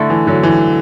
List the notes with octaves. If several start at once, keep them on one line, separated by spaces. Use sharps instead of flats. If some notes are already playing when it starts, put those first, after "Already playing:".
Already playing: D3 A3 E4 A4
E3
D3 F#3
E3